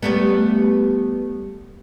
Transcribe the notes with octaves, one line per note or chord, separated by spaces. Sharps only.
G3 A3 B3